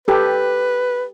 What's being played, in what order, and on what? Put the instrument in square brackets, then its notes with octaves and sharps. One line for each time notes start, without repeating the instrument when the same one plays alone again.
[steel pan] G4 A4 [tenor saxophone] B4